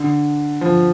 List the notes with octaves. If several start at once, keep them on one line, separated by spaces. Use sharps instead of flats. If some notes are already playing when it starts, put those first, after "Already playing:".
Already playing: D3
F3